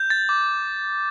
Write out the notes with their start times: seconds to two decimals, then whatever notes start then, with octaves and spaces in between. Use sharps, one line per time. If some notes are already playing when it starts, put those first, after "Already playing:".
Already playing: G6
0.10 A6
0.29 D6